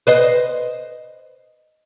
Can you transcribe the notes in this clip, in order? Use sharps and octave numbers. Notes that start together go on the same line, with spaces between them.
B4 C5 D#5